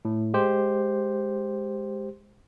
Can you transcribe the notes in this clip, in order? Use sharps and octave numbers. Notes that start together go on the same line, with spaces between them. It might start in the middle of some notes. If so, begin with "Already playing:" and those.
A2
G#3 G4 C5